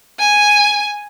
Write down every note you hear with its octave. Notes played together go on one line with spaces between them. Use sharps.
G#5